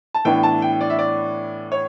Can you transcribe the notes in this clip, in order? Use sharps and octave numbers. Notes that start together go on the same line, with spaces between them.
A5
A2 E3 B3 D4 G5
A5
G5
D5
E5
D5
C#5